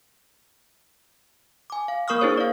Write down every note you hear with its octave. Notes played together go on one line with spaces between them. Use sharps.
G#5 D6
F5
A#3 A#4 C#6 D#6 F6
D4 E4 G#4 C5 C#5
D5 F5